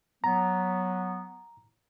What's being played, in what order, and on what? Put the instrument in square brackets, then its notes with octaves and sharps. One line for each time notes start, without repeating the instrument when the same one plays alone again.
[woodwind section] F#3 B3 [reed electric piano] A#5